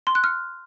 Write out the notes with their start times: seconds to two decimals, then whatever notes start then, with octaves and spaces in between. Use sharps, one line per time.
0.07 C6
0.15 F#6
0.24 F6